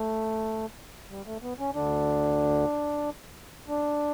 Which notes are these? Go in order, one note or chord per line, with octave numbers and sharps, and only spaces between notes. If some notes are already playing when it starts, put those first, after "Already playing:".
Already playing: A3
G3
A3
B3
C#4
D2 D3 D4
D4